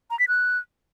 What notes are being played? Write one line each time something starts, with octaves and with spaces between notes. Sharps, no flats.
A#5
B6
F#6